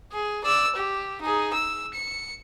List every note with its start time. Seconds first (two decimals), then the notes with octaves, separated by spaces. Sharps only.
0.12 G#4
0.44 D5 E6
0.76 G4
1.22 D#4 G#4
1.54 E6
1.94 C#7